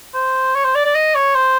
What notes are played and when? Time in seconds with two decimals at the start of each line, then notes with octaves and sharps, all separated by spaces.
0.14 C5
0.55 C#5
0.65 C5
0.75 D5
0.85 D5
0.95 D#5
1.15 C#5
1.35 C5